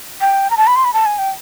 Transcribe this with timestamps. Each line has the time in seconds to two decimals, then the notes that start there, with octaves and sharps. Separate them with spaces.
0.21 G5
0.50 A#5
0.57 A5
0.67 B5
0.76 C6
0.84 B5
0.94 A5
1.06 G#5
1.18 G5